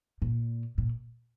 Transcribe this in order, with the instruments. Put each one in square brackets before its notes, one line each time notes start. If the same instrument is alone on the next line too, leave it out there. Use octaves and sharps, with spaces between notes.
[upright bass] A#2
A#2